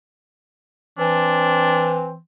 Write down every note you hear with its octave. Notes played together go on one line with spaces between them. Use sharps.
E3 C4 D4